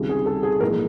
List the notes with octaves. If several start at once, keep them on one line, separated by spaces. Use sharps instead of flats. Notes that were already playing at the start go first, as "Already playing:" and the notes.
Already playing: C#2 C3 D#3 G3
G#4
A4
G#4
A#1 G#2 E3 G#3 A#4